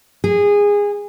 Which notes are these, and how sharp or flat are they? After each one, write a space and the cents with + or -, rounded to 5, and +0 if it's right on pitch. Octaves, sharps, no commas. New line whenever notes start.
G#4 -20